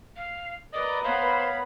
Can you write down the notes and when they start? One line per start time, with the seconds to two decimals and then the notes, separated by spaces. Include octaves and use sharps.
0.16 F5
0.74 A#4 B4 D5 D#5 A#5
1.04 B3 C5 C#5 F5 B5